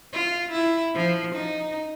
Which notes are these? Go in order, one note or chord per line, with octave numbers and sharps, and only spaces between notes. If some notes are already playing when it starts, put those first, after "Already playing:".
F4
E4
F3
D#4